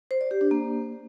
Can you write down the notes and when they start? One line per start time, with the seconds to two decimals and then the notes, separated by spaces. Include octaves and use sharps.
0.11 C5
0.21 D5
0.31 G4
0.41 D4
0.51 A#3